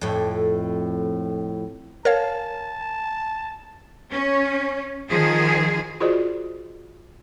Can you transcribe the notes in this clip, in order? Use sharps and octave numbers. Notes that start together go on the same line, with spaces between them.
F2 A2
A#4 C#5 F5 A5
C#4
D#3 F3 G#4
F4 F#4 G#4 C5 D5 D#5